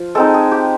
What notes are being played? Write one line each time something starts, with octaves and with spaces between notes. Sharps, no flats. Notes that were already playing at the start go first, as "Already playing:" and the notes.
Already playing: F3 F4
G#3 C4 D#4 A4
G#4
G4